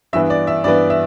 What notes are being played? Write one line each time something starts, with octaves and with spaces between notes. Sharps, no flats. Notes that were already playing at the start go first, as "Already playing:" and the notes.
G2 E3 B3 E5
D5
E5
G2 E3 B3 D5
E5